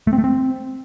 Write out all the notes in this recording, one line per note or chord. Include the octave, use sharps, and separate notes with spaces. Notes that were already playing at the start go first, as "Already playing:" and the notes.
A3
C4
A3
C4